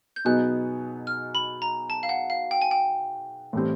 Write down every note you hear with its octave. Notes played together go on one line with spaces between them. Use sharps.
G6
B2 F#3 B3 D#4 G#4 F#6
F6
B5
A#5
A5
F5
F#5
F5
G5
G#5
G5
A2 E3 G3 C4